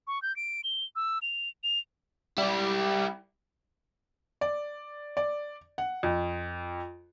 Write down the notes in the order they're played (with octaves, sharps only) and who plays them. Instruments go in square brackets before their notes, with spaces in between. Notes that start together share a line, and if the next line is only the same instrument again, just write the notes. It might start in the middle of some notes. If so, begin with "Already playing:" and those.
[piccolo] C#6
G6
D7
G7
E6
F7
F7
[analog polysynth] G3 [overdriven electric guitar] E4 G4
[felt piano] D5
D5
F#5
F2